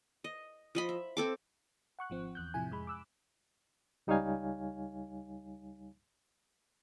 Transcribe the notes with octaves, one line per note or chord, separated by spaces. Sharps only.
D#5
F3 D#5 B5
E5
C4 A4 D6
F#5 C#6 F#6
G#1 F3 C4
E2 F#6 G6
A2 C3 F3 E4 G#5
F2 G#3 B5
D6 E6 F#6
C#2 G3 D#4 C#5 F5 G#5